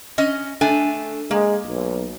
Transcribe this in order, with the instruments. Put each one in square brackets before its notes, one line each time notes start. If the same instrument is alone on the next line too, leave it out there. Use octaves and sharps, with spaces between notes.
[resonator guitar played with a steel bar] C#4 D#5
A3 D4 G#5
[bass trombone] G#3 [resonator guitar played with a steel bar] A#3
[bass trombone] B1